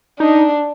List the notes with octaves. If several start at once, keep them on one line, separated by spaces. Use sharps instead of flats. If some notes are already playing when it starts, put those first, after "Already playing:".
D4 D#4